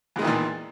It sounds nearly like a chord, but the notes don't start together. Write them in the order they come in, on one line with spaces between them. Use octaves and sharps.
E2 G#3 D#3 E3 A#2